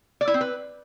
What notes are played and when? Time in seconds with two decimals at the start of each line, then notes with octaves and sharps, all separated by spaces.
0.21 D5
0.27 E4
0.34 C4
0.41 B4